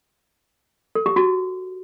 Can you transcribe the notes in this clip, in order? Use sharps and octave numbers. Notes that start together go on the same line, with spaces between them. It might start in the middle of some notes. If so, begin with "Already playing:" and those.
A4
G4
F#4